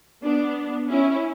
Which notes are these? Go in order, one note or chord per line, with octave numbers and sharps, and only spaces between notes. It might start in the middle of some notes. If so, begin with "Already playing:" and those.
B3 D4
C#4 E4